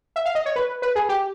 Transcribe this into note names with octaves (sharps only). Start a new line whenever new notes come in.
E5
F5
D#5
C#5
B4
B4
G#4
G4